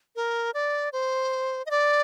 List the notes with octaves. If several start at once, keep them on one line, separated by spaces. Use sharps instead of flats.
A#4
D5
C5
D#5
D5